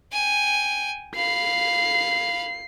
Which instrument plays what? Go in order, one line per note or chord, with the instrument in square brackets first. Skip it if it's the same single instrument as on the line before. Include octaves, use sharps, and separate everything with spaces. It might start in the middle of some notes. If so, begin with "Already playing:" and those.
[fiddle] G5 G#5
[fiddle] F5 B5 [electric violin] C7